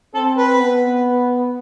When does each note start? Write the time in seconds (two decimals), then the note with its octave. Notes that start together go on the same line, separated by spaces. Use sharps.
0.14 C4 A4
0.37 B4
0.59 B3